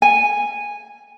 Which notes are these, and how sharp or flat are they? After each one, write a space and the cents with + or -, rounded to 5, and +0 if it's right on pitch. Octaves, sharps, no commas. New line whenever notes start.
G#5 -10